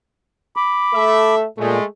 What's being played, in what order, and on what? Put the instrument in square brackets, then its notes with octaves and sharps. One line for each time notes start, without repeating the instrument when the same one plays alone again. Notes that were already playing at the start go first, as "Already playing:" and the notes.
[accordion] B5 D6
[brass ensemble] A3 A4 E5
[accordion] A#2 [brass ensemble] G#3 A3